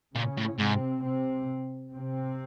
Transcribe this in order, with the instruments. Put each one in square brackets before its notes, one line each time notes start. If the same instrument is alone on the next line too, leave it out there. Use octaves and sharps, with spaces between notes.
[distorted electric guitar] A#2 [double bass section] C#3 C#4
[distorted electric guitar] A2
[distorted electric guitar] G#2 [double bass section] C3 C4
[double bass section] C3 C4
C3 C4